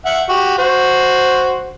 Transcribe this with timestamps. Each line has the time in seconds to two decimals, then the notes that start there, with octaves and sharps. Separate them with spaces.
0.05 E5 F#5
0.29 F#4 G4
0.58 F#4 C5